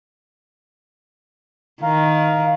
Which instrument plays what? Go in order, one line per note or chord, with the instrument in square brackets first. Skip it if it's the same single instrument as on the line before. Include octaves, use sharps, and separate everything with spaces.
[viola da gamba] D#3 [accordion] F5 A#5